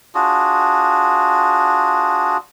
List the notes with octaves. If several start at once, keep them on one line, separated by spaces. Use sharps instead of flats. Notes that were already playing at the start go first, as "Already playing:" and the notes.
D4 F4 F#4 G#4